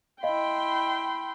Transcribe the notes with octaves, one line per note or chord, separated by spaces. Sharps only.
E4 D#5 F5 G5 B5 C6